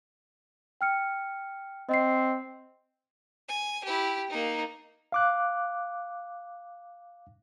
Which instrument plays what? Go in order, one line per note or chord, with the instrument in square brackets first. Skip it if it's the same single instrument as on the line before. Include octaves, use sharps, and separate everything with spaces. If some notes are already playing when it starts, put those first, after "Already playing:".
[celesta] G5 F6 C#7
[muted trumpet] C4 [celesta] D#5 C7
[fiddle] G#5
E4 G4
A#3 D#4
[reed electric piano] F5 D6 F#6